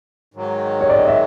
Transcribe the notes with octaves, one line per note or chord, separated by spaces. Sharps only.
G#2 D#3 F#3
C#5
D5
D#5
E5